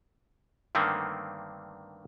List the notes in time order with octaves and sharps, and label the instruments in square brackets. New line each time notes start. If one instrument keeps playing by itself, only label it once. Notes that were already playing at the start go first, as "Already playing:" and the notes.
[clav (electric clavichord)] G2 D3 D#3 A3 A#3 C4